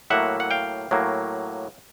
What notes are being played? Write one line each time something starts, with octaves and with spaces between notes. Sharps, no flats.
A2 F#3 A#3 E5 F#5
F#5
F5 G5
A2 F#3 A#3